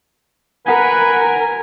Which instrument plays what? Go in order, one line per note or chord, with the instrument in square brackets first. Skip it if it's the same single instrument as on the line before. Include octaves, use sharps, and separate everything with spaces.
[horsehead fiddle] A#4 [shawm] B4 [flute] F#5 [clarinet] G#5